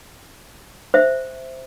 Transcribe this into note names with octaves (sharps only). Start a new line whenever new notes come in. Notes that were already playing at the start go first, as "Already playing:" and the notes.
C5 E5